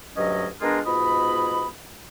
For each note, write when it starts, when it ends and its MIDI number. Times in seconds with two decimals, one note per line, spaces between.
0.16 0.47 38
0.16 0.47 43
0.16 0.47 54
0.16 0.47 61
0.16 0.47 75
0.61 0.79 56
0.61 0.79 59
0.61 0.79 62
0.61 0.79 65
0.61 0.79 68
0.61 0.79 70
0.86 1.67 44
0.86 1.67 47
0.86 1.67 65
0.86 1.67 75
0.86 1.67 83